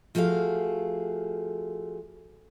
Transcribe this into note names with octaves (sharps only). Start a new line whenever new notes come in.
F3 A3 F#4 G#4 F5